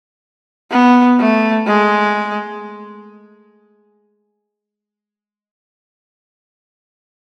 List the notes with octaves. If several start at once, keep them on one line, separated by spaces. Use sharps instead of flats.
B3
A3
G#3